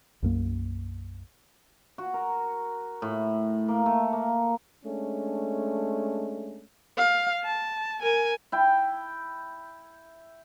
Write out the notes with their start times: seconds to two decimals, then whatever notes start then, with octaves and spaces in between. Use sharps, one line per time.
0.22 B1 F#2 A#3
1.98 F#4
2.14 A#4
3.02 A2
3.68 A#3
3.86 A3
4.13 A#3
4.84 G#3 A3 C#4 D4
6.98 F5
7.44 A5
8.02 A#4 G#5
8.52 E4 G5